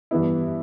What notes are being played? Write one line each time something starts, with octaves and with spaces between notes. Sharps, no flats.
G2 E3 B3 E4